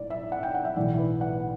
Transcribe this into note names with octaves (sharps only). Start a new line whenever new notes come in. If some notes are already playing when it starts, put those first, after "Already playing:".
Already playing: A2 D5
E5
F#5
G5
F#5
E5
B1 A2 E3 D5
B4
F#5